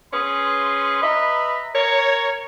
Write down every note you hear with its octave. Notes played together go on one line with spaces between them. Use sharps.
C#4 G#4 B4 C6
B4 D#5 E5 A#5 B5
A#4 C#5